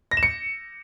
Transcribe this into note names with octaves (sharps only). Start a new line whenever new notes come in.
A#6
E7
C#7